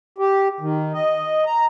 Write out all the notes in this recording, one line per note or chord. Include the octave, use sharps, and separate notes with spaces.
G4
D#3
D#5
A#5